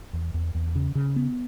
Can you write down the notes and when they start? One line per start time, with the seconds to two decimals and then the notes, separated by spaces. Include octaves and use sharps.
0.13 E2
0.34 E2
0.55 E2
0.75 C#3
0.95 C#3
1.16 B3